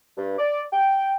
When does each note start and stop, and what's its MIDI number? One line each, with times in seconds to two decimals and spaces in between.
0.18 0.37 43
0.39 0.62 74
0.73 1.16 79